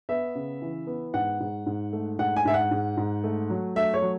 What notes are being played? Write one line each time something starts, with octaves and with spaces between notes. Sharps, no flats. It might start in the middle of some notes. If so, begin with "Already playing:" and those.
B3 E5
C#3
E3
B3
G#2 F#5
G#2
G#2
A3
G#2 F#5
G#5
G#2 E5
F#5
G#2
G#2
A3
F#3
A3 E5
C#5
F#3